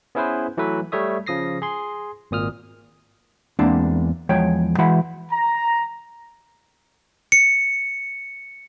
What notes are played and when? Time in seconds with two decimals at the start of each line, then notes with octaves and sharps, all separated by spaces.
0.15 B3 C#4 E4 G#4 B4 C5
0.57 E3 F#3 A3 B4 E5
0.92 G3 A3 C#5 E5 D#6
1.27 C#3 F3 D#6 A#6 C7
1.62 G#4 C6
2.31 G#1 A#2 D#6 F6
3.59 E2 G#3 A#3 C4 D4
4.29 E2 F3 G#3 C#5 G5
4.78 E3 G#3 F#4 E5 F#5 B5
5.32 A#5
7.32 C#7